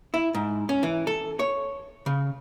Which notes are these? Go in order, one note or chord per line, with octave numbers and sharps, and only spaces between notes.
E4
G#2
C#4
E3
A4
C#5
C#3